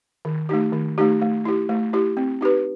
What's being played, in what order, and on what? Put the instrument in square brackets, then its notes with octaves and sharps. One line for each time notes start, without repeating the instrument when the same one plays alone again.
[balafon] D#3
A3 D#4 G4
D#3
A3 D#4 G4
A3
E4 G4
A3
E4 G4
C4
D#4 G4 B4